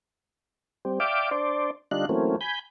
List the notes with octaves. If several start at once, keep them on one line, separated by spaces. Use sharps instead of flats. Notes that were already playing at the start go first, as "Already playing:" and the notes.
G3 C4
D5 E5 F5 G5 D6
D4 C5 D5
D3 G3 D4 D#4 F4 F#6
E3 F#3 A3 A#3 C4 C#4
G#5 B5 G6